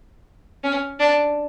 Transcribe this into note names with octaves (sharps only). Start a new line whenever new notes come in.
C#4
D4